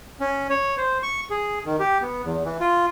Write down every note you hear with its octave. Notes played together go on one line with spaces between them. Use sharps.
C#4
C#5
C5
C#6
G#4
D#3
G4
B3
E2
E3
F4